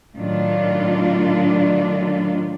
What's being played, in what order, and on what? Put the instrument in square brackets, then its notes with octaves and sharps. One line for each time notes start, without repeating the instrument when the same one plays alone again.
[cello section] A2 D#3 F#3 D4 F4